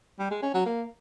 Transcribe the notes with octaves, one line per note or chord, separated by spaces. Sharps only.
G3
G#3
C#4
F#3
A#3